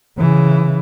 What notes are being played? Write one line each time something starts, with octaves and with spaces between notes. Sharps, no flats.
C#3 E3